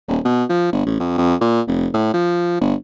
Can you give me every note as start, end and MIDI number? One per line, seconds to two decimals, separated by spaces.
0.08 0.19 27
0.25 0.44 47
0.49 0.69 53
0.72 0.85 31
0.86 0.99 33
1.00 1.14 41
1.18 1.35 41
1.41 1.61 46
1.68 1.88 29
1.94 2.13 45
2.14 2.58 53
2.61 2.74 31